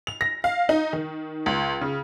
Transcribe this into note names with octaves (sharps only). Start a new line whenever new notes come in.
F7
A#6
F5
D#4
D#3
C#2
C#3